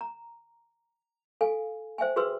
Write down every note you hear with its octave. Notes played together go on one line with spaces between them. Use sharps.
A#5
A4 F5 G#5
C5 E5 G5 G#5
F#4 G#4 B4 C6 E6